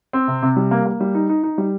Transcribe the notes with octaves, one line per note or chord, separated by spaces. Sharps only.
C4
C3
C3
G3
A#3
A#3
G3
D#4
D#4
D#4
G3